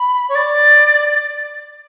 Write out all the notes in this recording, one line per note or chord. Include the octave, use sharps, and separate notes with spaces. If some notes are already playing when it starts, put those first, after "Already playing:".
Already playing: B5
C#5
D5